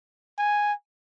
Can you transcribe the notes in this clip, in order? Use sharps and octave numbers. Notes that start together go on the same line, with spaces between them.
G#5